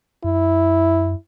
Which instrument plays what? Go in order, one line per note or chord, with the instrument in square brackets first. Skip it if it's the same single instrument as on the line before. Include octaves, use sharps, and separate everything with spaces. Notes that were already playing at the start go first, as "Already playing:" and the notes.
[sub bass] F#2 [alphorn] E4